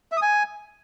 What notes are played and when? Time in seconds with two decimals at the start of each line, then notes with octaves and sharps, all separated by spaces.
0.12 E5
0.17 D#6
0.22 G#5